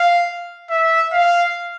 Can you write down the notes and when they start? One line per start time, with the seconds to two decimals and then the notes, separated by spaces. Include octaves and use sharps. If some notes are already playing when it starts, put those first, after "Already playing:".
Already playing: F5
0.70 E5
1.13 F5